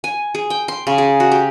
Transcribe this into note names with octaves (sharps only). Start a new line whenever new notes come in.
G#5
G#4
G5
C6
C#3
G#4
F#4
G4